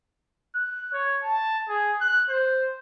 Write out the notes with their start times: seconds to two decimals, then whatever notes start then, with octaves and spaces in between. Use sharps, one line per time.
0.55 F#6
0.93 C#5
1.23 A5
1.69 G#4
2.01 F#6
2.30 C5